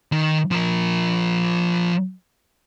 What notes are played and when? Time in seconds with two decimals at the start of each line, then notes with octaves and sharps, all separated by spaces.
0.12 D#3
0.51 F3 A#4